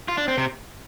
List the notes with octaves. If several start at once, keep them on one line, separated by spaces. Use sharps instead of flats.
F4
D4
C4
C3